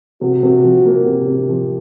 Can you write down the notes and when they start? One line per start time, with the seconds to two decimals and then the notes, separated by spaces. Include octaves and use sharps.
0.21 C3 F#4
0.43 C3
0.64 F3
0.85 A#3
1.05 C3 G4
1.28 C3
1.49 F3